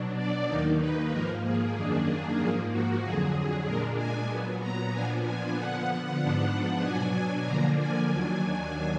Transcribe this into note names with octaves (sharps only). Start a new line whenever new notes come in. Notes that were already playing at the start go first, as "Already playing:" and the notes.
Already playing: B2 F#3 D4
D5
D#2 D#3 A#3 D#4
B4
G#2 F3 A#3 A#4
G#4
F#2 D#3 A#3 D4 G#4
G#2 F3 A#3 G#4
F#4
F2 D3 F#3 G#4
A#2 G#3 D4 A#4
G#5
A#2 F#3 B3
A#5
A#2 F3 B3 D4 G#5
G#5
D3 F3 B3 F#5
G#2 F3 B3 D4 F#5
B2 F#3 D4 G#5
D3 F3 A#3 D4 A#5
G#5
D#2 D#3 F#3 D4 G#5